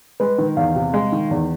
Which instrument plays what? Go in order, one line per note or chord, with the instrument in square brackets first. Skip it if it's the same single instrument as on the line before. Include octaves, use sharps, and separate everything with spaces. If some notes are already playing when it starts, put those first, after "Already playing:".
[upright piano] G#3 [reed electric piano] B4
[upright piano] D#3
[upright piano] E2 [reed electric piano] F5
[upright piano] C3
G#3
D#3
E2